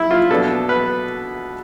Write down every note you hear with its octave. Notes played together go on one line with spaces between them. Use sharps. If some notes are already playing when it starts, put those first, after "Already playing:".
Already playing: E4
F4
B2 B3 D4 A4
B4